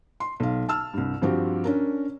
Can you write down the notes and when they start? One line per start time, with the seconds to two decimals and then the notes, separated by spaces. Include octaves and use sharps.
0.20 C6
0.40 B1 F5
0.69 A5 E6 F6
0.94 C2 G2
1.22 G2 F3 C4 F#4 G4
1.64 C#4 D4 A#4